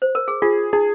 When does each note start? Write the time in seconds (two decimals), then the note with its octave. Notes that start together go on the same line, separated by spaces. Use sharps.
0.02 C5
0.15 A#4
0.28 G#4
0.42 F4 G#4
0.73 D#4 G#4